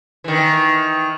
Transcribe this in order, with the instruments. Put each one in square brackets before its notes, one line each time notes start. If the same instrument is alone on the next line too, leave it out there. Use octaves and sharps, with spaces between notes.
[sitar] D#3 E3